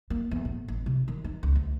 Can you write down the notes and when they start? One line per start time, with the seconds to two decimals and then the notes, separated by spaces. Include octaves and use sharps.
0.10 A#3
0.31 E2
0.45 A2
0.68 A1
0.86 C3
1.08 D#3
1.24 D#4
1.43 C#2
1.56 D2